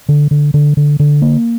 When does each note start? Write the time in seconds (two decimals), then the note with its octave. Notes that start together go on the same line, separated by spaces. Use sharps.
0.09 D3
0.31 D3
0.54 D3
0.77 D3
1.00 D3
1.22 A#3